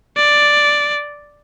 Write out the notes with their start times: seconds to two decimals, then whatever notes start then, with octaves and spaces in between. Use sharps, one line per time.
0.17 D5